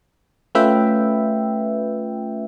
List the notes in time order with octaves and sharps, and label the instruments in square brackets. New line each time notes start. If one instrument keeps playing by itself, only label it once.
[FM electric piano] A3 C#4 F4 B4 E5 G5